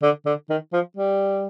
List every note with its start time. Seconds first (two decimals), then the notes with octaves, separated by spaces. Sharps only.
0.02 D3
0.26 D3
0.49 D#3
0.73 F3
0.97 G3